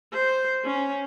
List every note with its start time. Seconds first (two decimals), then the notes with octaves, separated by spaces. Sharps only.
0.13 C5
0.65 C#4